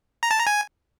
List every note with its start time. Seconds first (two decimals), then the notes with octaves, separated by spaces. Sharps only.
0.23 A#5
0.31 A5
0.39 A#5
0.47 G#5